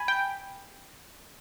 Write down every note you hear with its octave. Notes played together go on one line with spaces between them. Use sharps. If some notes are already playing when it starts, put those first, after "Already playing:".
Already playing: G#5 B5
G5